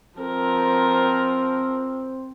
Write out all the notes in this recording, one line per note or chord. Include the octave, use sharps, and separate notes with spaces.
F3 C4 A#4